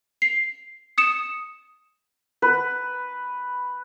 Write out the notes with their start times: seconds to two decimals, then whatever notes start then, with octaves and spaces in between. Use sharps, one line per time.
0.22 C7
0.98 D#6 C#7 E7
2.42 B4